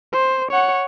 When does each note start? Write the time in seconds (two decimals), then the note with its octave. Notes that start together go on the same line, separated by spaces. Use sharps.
0.13 C5
0.51 C#5 F#5